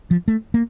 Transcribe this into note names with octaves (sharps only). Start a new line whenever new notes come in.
F3
A3
A#3